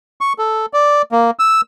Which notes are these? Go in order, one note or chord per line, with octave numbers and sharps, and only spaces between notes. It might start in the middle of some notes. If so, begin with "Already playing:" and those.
C#6
A4
D5
A#3
E6